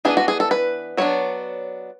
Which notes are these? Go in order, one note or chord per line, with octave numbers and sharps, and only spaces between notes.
E3 B3 D4 G#4
F#4
G#4
A4
B4
F#3 B3 D4 C#5